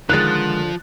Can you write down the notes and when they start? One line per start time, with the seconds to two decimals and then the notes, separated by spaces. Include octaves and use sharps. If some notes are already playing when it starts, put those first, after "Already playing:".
0.09 D3 D#3 F3 G#3 F#6 A6